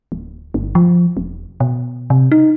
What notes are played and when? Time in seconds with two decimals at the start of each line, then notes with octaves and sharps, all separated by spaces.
0.12 D1
0.54 G1
0.75 F3
1.17 E1
1.60 B2
2.10 C3
2.32 D#4